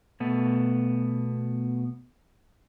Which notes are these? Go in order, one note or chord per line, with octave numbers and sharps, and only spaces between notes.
B2 A3 B3